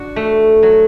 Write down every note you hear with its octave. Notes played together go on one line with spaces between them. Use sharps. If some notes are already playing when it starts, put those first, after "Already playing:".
Already playing: D4 F#4
A3
F#3